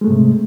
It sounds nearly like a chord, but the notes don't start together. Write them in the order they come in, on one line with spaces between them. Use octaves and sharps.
G#3 A3 G#2 C3